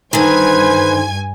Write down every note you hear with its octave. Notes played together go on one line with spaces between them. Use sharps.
G2 D3 D#3 B4 C5 G#5 G#6